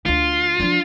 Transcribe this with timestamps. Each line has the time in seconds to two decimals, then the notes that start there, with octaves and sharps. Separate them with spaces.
0.06 D2 D4 F4
0.60 F3 D4